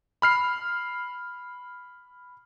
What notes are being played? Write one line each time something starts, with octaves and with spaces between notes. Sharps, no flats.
B5 F6 C7